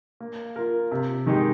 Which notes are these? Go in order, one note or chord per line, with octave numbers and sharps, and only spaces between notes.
A#3
F4 A#4
C3
D#3 G#3 D#4 G4